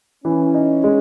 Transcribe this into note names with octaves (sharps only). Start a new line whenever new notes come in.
E3 C#4
D#4
G#3